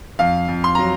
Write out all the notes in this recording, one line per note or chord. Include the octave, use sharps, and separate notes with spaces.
F2 F5
F2
C6
F#3 A#5